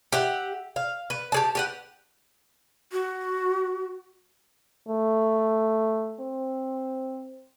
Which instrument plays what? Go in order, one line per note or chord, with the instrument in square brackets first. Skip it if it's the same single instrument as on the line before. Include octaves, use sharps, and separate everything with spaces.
[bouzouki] G4 E5 F#5
F5
B4
G4 G#4 A5
G4 B4 F#5
[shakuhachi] F#4
[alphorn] A3
C4